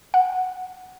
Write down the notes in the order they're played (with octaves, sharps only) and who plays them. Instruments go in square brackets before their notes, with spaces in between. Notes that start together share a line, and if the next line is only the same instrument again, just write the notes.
[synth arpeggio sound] F#5